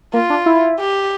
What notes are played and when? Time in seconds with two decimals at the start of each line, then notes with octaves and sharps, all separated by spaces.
0.14 A#3 F4
0.30 D4
0.46 E4
0.79 G4